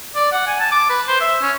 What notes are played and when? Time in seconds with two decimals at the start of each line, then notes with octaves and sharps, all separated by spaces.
0.15 D5
0.32 F#5
0.47 G#5
0.60 A5
0.72 D6
0.89 B4
1.08 C5
1.21 E5
1.42 C#4